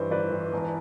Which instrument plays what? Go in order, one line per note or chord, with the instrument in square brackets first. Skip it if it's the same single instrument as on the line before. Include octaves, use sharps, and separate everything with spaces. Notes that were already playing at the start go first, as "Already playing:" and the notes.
Already playing: [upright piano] G2 E3 C5
G1 B4 D5
E3
E1